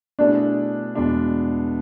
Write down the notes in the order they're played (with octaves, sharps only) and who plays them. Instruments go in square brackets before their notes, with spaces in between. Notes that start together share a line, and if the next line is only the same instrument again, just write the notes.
[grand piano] B2 A3 E4 G#4 [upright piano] D4
[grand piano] E2 B2 G#3 D4